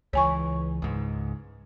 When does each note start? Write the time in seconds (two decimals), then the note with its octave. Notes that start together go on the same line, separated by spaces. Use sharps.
0.13 C#2 E3 C#5 G#5 C#6
0.82 C#2 G#2